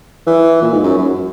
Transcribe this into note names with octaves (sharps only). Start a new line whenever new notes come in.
E3
A#2
G#2
F#2
F#2